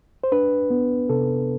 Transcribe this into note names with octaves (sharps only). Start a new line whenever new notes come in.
C5
D4 B4
B3
C3 A4